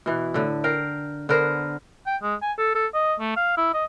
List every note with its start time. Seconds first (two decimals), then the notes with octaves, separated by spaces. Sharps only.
0.06 B2 E3
0.34 A2 D3
0.64 A#4 F5 G5
1.29 D3 B3 A#4 C5
2.07 G5
2.22 G#3
2.42 G#5
2.58 A4
2.75 A4
2.94 D#5
3.20 A3
3.36 F5
3.57 E4
3.74 D#5